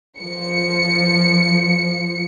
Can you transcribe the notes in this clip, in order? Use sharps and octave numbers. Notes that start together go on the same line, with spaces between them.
F3 C#7